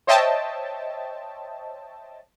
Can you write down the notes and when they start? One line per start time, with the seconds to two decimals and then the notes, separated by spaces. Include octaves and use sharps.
0.07 C5 C#5 D#5 E5 G5 A5